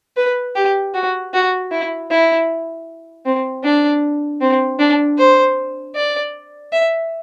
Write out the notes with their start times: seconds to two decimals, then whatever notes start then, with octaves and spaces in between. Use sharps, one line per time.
0.17 B4
0.55 G4
0.94 F#4
1.33 F#4
1.71 E4
2.10 E4
3.25 C4
3.63 D4
4.41 C4
4.79 D4
5.18 C5
5.95 D5
6.72 E5